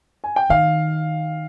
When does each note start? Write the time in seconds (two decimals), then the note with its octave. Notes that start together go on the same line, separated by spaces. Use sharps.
0.24 G#5
0.36 G5
0.50 D#3 F5